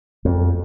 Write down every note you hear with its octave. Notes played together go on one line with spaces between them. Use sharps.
F2